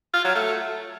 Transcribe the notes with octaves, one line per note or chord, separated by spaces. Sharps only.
F4
F#3
A3